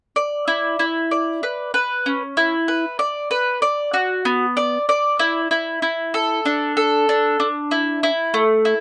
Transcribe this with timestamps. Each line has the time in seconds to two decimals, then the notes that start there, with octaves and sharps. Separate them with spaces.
0.16 D5
0.48 E4
0.79 E4
1.11 D5
1.43 B4
1.74 B4
2.06 C#4
2.37 E4
2.68 B4
2.99 D5
3.31 B4
3.62 D5
3.94 F#4
4.25 B3
4.57 D5
4.89 D5
5.19 E4
5.51 E4
5.82 E4
6.14 A4
6.45 D4
6.77 A4
7.09 D4
7.40 D4
7.71 E4
8.03 E4
8.34 A3
8.65 E4